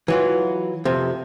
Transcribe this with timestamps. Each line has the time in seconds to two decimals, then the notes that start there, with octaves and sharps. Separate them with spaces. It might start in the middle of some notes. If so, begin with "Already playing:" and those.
0.08 E3 F#3 F4
0.85 F2 C3